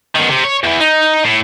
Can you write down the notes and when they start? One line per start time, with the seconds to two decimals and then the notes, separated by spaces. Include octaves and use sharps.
0.16 B2 D#3
0.30 C3
0.44 C#5
0.64 E2 E3
0.80 D#4
1.24 A2